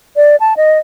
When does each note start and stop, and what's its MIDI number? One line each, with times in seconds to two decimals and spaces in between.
0.16 0.36 74
0.40 0.54 81
0.57 0.78 75